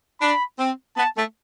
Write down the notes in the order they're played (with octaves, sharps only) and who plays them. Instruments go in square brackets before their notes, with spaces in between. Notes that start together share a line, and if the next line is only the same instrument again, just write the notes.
[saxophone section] D4 [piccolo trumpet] B5
[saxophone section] C4
[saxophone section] B3 [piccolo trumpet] A5
[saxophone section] A3